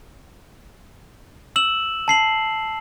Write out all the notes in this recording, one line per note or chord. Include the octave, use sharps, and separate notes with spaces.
E6 E7 F#7
A5 C7 F#7